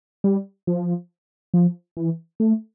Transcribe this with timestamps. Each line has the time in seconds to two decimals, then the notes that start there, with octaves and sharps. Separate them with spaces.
0.24 G3
0.67 F3
1.54 F3
1.97 E3
2.40 A3